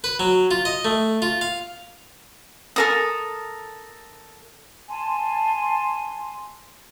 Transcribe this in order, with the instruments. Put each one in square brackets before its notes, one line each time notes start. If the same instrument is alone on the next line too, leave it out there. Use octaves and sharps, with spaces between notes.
[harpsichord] B4
F#3
F4
D#5
A3
F4
F5
[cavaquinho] A4 A#4 D#6
[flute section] G#5 A5 C6